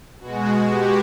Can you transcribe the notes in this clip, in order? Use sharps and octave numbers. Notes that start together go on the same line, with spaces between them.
B2 G#3 F#4
G4